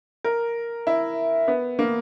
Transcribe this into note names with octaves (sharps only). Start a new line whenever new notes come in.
A#4
E4
B3
A#3